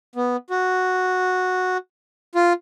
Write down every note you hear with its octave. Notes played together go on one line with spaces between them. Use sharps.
B3
F#4
F4